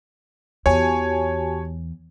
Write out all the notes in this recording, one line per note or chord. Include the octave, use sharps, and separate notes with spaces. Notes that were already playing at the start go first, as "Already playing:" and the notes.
E2 F#4 G4 C#5 G#5 A5